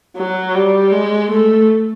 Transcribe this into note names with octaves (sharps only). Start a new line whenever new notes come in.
F#3
G3
G#3
A3